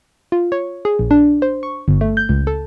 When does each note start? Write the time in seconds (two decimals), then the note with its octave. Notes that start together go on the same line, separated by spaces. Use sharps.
0.32 F4
0.52 C#5
0.85 G#4
0.99 A#1
1.11 D4
1.42 C5
1.63 C#6
1.88 G1
2.01 A3
2.17 G6
2.29 C#2
2.47 A4